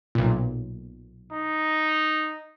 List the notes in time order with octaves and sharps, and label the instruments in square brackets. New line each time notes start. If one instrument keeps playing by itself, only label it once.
[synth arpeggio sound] B1 A#2
[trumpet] D#4